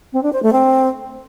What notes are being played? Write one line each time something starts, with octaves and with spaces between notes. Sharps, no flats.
C4
D4
C5
A3
C4